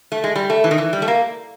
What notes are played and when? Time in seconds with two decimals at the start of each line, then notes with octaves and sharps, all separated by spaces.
0.12 A3
0.24 G#3
0.36 G3
0.50 A3
0.64 E3
0.71 D#3
0.78 E3
0.93 G3
1.02 A3
1.08 A#3